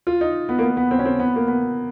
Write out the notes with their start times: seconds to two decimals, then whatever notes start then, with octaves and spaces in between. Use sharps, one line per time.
0.07 F4
0.21 D#4
0.49 B3
0.59 A#3
0.63 B3
0.77 B3
0.91 C4
0.99 C#4
1.05 C4
1.20 B3
1.36 A#3
1.48 B3